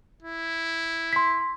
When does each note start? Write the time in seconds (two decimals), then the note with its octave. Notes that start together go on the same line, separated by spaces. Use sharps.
0.23 E4
1.13 C6 B6